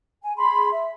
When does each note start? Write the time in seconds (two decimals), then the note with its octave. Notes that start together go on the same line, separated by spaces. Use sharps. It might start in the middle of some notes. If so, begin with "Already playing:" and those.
0.23 G#5
0.36 G#4 B5 C6
0.72 E5